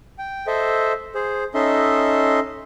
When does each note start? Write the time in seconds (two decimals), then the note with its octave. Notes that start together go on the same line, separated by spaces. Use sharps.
0.18 G5
0.47 A4 C5 D#5 E5
1.15 G#4 C5
1.54 C#4 D#4 A4 D#5 E5 C6